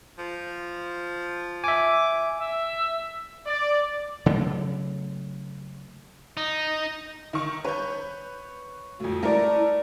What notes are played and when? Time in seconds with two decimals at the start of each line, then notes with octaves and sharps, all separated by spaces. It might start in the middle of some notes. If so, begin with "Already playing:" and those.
0.18 F3
1.64 E5 G#5 D6
2.39 E5
3.47 D5
4.26 C#3 F#3 A3
6.37 D#4
7.33 D#3 C#6
7.64 B4 C#5 G6
9.00 F2 A2 F#4
9.23 A3 E4 A#4 D5 A#5